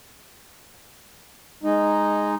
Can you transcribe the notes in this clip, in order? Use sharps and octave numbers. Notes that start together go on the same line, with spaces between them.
G#3 D#4